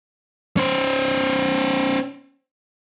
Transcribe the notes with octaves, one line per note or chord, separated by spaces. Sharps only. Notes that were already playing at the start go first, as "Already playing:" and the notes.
C#4 C5